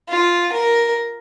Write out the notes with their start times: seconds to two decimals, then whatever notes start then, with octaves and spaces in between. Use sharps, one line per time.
0.09 F4
0.52 A#4